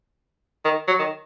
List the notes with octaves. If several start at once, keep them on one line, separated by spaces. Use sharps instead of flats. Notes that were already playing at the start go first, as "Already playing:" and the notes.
D#3
F#3
D#3